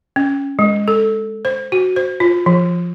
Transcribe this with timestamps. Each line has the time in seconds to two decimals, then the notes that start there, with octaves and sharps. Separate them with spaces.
0.16 C#4
0.59 G#3
0.88 A4
1.45 C5
1.72 F#4
1.96 C5
2.20 F4
2.46 F3